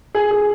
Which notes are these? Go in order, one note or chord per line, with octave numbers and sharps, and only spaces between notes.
G#4
G#4